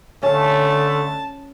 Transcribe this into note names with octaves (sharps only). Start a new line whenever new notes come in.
D3 A3 C#4 F5 A5